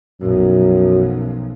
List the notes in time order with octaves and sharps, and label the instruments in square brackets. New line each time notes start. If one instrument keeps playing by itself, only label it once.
[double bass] B1 F3 [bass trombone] F#2